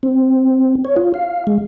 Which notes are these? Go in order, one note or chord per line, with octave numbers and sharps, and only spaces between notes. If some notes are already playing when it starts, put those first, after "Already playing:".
C4
C#5
F4
F5
G#3